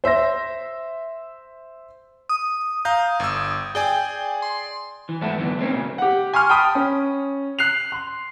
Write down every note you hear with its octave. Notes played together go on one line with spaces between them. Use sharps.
C5 E5 C6 A#6
D#6
F5 A#5 G6
G1 E6
G#4 D5 G5 G#5
C6
E3
E2 G#2 A3 B3 A4
F#2 D3 E3 B3
A3 C4 C#4 D#4
A#2 C#3 A#3
G4 F#5
G#5 C6 C#6 F6
G5 A5 B5 D#6
C#4
F#6 C7 F7
C6